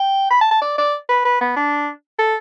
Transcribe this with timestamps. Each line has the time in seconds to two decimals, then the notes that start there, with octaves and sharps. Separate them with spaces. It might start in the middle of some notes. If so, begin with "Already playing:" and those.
Already playing: G5
0.30 B5
0.41 A5
0.51 A5
0.61 D5
0.78 D5
1.09 B4
1.25 B4
1.41 B3
1.56 D4
2.19 A4